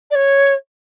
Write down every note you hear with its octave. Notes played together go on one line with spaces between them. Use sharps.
D5
C#5